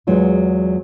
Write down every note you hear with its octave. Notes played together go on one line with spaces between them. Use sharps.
E2 F#3 G#3 F4